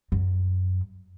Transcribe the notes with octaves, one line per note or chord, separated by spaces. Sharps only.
F#2